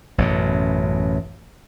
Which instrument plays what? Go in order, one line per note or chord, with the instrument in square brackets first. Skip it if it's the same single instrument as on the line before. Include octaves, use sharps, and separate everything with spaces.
[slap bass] A1 F#2 B2